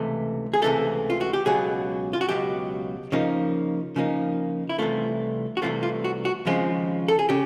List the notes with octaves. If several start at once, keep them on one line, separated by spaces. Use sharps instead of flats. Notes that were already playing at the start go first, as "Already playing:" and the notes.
Already playing: C#2 C3 E3 A3
G#4
C#2 C3 E3 A3 A4
F4
F#4
G4
C#2 B2 F#3 G#4
F4
F#4
C#2 B2 F#3 G4
C#3 F3 A#3 D#4
C#3 F3 A#3 D#4
E4
C2 C3 E3 A3 F4
F#4
C2 C3 E3 A3 F4
F4
F#4
F#4
D#2 C#3 F3 G#3 C4 F4
A4
G#4
C#3 G4